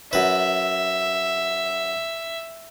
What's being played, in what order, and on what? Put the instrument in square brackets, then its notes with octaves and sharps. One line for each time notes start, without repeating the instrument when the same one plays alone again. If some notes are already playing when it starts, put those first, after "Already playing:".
[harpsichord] F#2 B4 [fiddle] E5